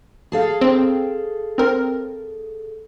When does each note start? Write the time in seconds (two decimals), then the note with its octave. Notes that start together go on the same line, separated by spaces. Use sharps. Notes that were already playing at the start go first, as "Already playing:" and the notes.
0.32 G#4 A4 F5
0.61 C4
1.58 C4 A#4